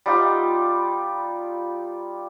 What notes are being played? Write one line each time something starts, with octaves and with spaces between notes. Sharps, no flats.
G3 D#4 F4 G4